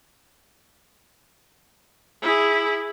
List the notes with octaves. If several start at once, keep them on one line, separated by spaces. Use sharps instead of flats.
E4 G#4